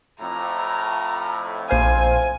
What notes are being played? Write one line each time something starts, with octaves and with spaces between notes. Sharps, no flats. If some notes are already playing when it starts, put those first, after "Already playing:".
F2 A2 A#5
A#1 C5 F5 G#5